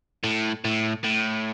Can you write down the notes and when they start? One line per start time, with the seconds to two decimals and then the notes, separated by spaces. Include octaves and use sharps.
0.24 A2
0.65 A2
1.04 A2